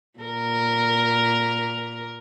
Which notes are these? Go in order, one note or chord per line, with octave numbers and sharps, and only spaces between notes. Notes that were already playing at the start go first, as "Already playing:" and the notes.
A#2 A#4